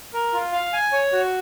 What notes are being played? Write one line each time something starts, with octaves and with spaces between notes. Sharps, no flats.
A#4
F4
F5
G#5
C#5
F#4